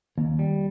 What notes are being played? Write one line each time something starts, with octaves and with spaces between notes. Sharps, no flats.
D#2
G3